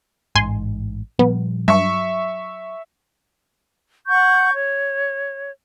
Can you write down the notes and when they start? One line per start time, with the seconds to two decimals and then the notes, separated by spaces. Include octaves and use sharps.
0.36 A1 G#2 G#5 C6
1.19 A#2 F3 G3 B3
1.68 G2 F#3 E5 C#6
4.07 F#5 C#6 G6
4.52 C#5